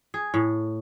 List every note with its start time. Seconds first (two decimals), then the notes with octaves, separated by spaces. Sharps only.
0.14 G#4
0.34 A2